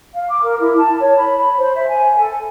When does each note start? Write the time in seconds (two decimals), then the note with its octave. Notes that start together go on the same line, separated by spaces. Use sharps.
0.14 F5
0.29 D6
0.43 A#4
0.59 E4
0.78 A5
1.00 C#5
1.17 B5
1.35 B5
1.58 C5
1.75 E5
1.88 G#5
2.18 A4